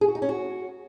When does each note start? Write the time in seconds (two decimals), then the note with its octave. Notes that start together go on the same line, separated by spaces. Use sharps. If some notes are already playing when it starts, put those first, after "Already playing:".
0.01 G#4
0.08 F#4
0.15 D#4
0.22 C#4
0.29 F#4